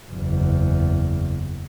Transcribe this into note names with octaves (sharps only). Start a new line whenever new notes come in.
F#1 E2